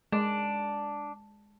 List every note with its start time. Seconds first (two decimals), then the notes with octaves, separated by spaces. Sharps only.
0.12 G#3 D4